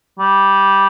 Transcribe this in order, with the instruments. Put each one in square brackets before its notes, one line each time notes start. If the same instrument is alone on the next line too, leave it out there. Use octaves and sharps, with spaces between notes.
[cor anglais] G3